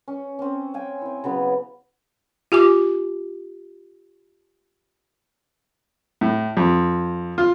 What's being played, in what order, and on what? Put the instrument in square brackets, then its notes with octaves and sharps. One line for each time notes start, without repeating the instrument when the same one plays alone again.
[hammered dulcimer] C#4
C4 C#4
F5 G5 G#5
C4 E4
C#3 F#3 B3
[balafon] F4 G4 G#5 D6
[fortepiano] A2
F2
F4